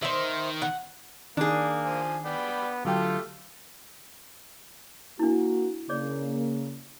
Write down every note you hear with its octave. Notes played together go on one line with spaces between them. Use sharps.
D#3 C5 E5
F#5
D#3 A#3 D4 G#4
F3 C5 G#5
B3 D5 G5 B5
D3 F#3 A3 F4 G4 A4 G5
A#3 D4 E4 F#4
C#3 A#3 G#4 C#5 D5